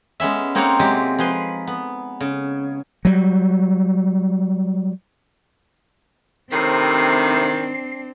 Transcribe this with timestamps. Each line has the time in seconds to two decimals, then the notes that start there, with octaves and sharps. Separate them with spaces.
0.20 G#3 B3 C#4 E5
0.55 A#3 C4 D#4 C#5 F5 F#5
0.79 C3 F#3 G#3 G4
1.19 F3 G#4 B4 C6
1.67 B3
2.21 C#3
3.05 F#3 G3
6.52 A2 C3 D#3 C4 D4 C7